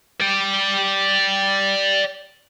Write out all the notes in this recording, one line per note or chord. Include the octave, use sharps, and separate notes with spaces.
D5 G5